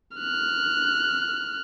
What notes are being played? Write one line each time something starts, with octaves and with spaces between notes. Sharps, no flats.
F6 F#6